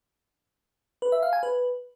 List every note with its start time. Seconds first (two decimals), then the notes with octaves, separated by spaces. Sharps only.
1.02 B4
1.12 E5
1.22 F5
1.33 G#5
1.43 B4